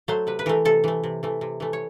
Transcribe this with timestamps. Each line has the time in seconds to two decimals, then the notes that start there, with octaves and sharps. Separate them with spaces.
0.08 F#3 A3 C5
0.27 C3 B4
0.39 B4
0.46 E3 A3 A#4
0.65 C3 A4
0.84 E3 A3
1.03 C3
1.23 E3 A3
1.41 C3
1.60 E3 A3
1.73 C#5